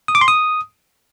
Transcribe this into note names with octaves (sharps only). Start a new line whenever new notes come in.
D#6
D6
C6
D#6